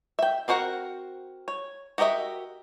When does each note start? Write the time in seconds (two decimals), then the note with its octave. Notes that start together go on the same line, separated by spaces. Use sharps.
0.19 E5 G5
0.48 C4 D4 F#4 A#4 F#5
1.48 C#5
1.98 F#4 G4 A#4 D#5 E5